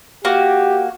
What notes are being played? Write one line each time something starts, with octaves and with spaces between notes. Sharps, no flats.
A#3 F#4 G4